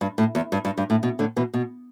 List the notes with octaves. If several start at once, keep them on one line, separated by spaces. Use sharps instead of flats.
G2
A2
E2
G2
G2
G2
A2
B2
A2 D3
B2 E3
B2